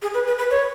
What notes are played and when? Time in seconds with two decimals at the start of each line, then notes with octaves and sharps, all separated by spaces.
0.02 G#4
0.14 B4
0.27 B4
0.38 B4
0.51 C#5